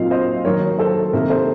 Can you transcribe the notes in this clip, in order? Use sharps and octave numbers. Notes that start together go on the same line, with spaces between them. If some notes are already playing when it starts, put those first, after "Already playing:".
Already playing: A#2 F#3 C4 D#4 F5
C5 D#5
D#3 F#3 A#3 A#4 C#5
A4 C5
C3 D#3 A#3 A#4
A4 C5